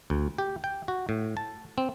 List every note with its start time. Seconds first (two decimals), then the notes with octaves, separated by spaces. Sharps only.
0.10 D2
0.38 G4
0.64 G5
0.88 F#4
1.09 A2
1.37 A5
1.78 C4